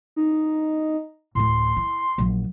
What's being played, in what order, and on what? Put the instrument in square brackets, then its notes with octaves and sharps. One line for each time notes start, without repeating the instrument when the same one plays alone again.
[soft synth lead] D#4
[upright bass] D2 A2 [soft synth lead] C6
[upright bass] E4
A#1 F#3